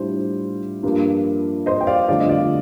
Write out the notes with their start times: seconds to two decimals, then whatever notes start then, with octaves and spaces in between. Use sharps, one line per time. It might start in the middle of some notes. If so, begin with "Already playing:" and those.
Already playing: A2 G3 D4 F4 C5
0.83 G2 F3 A#3 D4 F4
1.66 C5 D#5
1.81 G5
1.87 D5 F5
2.08 G1 F2 D3 A3 D5 F5
2.20 D#5
2.29 D5 F5